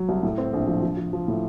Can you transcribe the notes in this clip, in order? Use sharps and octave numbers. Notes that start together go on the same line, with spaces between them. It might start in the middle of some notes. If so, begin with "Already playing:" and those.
Already playing: F#3
C2
A2
C4
A#1
F3
F3
F3
F3
A2